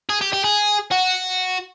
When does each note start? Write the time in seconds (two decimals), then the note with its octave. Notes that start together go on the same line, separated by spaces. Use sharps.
0.09 G#4
0.21 G4
0.33 G4
0.44 G#4
0.92 F#4